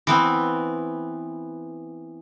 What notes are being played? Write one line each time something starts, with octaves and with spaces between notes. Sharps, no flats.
E3 B3 C4